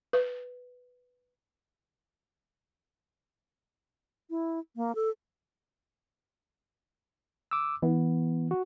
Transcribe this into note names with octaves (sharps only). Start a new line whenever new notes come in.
B4
E4
A#3
A4
D6 E6
E3 B3
F#4